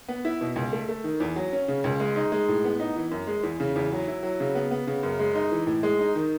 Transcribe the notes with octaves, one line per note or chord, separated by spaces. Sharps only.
B3
E4
B2
C#2
A3
A3
D#3
E2
F#3
C#4
C#3
C#2
G#3
D#4
G#3
A2
B3
D#4
E3
F#2
G#3
E2
C#3
E2
F#3
E4
F#3
C#3
B3
B3
C#3
F#2
G#3
D#4
E3
A2
G#3
D#4
D#3